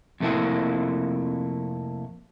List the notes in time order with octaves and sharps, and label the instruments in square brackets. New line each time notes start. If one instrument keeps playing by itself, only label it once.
[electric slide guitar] F2 C3 A3 A#3 E4 F#5